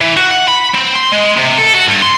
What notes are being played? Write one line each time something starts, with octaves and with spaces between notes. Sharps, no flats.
E3
F#4
F#5
B5
C4
C6
G#3
C3
A4
F#4
G2
C6